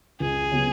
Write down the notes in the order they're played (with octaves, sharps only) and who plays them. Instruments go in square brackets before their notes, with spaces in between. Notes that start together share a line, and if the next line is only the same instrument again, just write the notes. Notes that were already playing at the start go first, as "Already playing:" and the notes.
[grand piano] C#2 [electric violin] G#4
[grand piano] C#3 F#3 B3 F#4